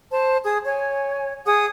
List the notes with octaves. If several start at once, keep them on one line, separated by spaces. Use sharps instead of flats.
C5 A5
G#4 D#6
C#5 G#5
G#4 F#5 D#6